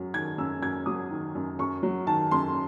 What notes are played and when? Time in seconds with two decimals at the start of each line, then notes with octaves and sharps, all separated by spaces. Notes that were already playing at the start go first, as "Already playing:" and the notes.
Already playing: F#2 F#3
0.14 D#3 G#6
0.38 F#2 E6
0.62 F#2 G#6
0.86 F#3 D#6
1.11 D#3
1.35 F#2
1.59 F#2 C#6
1.83 F#3
2.07 D#3 A5
2.31 F#2 C6